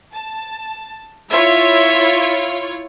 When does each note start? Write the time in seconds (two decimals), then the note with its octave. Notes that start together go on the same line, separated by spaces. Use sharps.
0.12 A5
1.30 E4 F4 C#5 E5